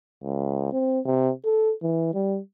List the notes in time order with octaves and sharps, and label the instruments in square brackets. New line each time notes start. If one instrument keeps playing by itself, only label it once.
[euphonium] C#2
C4
C3
A4
E3
G3